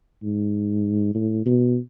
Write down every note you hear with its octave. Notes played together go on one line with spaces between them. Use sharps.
G#2
A2
B2